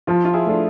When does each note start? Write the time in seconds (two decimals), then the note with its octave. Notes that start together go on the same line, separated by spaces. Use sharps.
0.07 F3 F4
0.25 F4
0.33 E4 G#4
0.46 A3 D4 F4